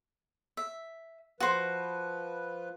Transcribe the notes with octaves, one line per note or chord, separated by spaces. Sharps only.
E5
F3 F#4 B4 C5